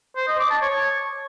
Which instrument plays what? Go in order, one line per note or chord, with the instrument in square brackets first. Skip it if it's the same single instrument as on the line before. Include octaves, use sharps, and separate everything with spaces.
[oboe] C5
D#5
D6
A5
C#5